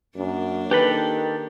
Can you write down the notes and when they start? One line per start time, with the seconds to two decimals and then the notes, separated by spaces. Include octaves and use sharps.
0.16 F#2 A#3 D4
0.71 D#3 G4 A4 B4 B5